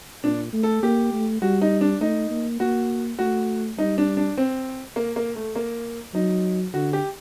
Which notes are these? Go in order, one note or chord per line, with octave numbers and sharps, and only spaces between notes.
A#2 D4
A3
A4
A#3 G4
A3
G3 F#4
D#4
D4
A3 D#4
A#3
A#3 F#4
A3 F#4
G3 D#4
D4
D4
C4
A#3
A#3
A3
A#3
F#3 D#4
D3 F#4
G4